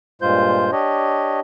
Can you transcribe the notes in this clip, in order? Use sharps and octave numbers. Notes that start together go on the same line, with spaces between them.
G2 A#2 G#3 F4 C5 G6
D4 G4 C#5 D#5